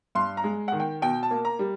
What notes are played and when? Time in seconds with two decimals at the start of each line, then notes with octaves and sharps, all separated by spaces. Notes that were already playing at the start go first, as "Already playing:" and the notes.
0.15 G2 C6
0.37 A#5
0.44 G#3
0.68 D#3 F#5
0.80 G5
1.02 B2 G5
1.23 A5
1.31 A#3
1.45 A#5
1.59 G3